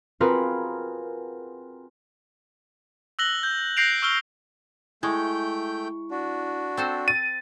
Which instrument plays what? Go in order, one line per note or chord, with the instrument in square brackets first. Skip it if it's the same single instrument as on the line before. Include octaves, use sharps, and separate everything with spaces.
[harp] C4 F4 F#4 G#4 A#4 B4
[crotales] E6 F#6 A#6 F#7 G7
G6
F#6 G6 A#6 C7 D7 F7
C#6 E6 F6 G7
[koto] G#3 [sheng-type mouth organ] A3 G5 G6 [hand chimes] E4 C#6
[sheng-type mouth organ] D4 F#4
[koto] C4 A4 C5
[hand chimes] A6 [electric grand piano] D#7